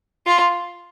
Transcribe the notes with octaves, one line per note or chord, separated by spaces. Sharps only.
F4